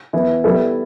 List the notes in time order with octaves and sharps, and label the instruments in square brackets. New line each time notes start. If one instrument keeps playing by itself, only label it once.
[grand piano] E3 B3 E4
G3 B3 E4 A4